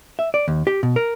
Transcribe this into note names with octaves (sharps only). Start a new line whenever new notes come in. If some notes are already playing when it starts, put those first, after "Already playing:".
E5
D5
D#2
G4
B2
A#4